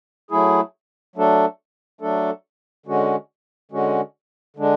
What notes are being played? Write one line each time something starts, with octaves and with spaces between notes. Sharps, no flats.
F#3 A3 E4 G#4
F#3 A3 D4 A4
F#3 A3 D4 A4
D3 G#3 C#4 F#4
D3 G#3 C#4 F#4
D3 G#3 D4